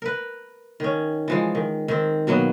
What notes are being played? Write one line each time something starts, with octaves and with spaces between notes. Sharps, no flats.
A#4 B4
D#3 C#4
E3 F3 G#3
D#3
D#3 C4
B2 F#3 A#3 B3